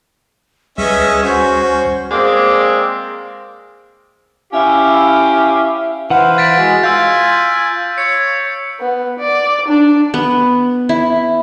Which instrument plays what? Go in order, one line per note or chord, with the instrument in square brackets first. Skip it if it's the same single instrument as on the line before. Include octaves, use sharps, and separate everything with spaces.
[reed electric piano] D2 G3 [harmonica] C#4 D#5 E5 [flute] G#4 [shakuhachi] B4
[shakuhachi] C#4 [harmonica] F#4 [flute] C5
[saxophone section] G#3 A#3 C4 G#4 D5
[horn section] C#4 E4 G4 E5 F5
[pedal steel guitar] E3 F#5 [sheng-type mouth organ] B4 C5 F5
[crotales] A6 B6 D7
[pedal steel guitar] G#3 [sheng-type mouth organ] F#4
[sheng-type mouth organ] F4 G#5 [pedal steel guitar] F5 [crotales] E6 G6
[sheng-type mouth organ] C#5 [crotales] C#7
[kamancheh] B3
D5
D4
[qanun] B3
E4